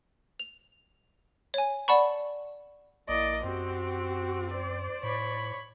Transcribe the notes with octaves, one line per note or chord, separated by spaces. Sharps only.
F7
C#5 G#5
D5 F#5 A5 B5 C#6
A#1 A#3 E4 D5 D#5
F#2 C4 F#4 G4
C5 D5
A2 C#5 B5